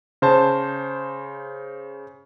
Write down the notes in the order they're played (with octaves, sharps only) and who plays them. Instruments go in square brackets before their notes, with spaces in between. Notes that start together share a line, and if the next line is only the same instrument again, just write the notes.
[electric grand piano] C#3 C5 A5